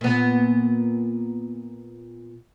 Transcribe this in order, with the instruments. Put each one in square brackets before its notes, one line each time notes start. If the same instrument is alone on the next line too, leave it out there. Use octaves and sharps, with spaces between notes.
[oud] A#2 B3